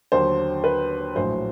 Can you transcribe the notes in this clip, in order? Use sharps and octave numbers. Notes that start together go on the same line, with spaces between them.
D#2 D3 F#3 C5
B4
A#1 A2 F#3 C5